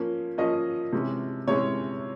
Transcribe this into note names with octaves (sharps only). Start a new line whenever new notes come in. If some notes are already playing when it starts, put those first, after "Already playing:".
Already playing: F3 A#3 C#4
F3 A#3 C#4 D#5
C3 E3 G#3 C#4
C3 E3 G#3 C#4 C#5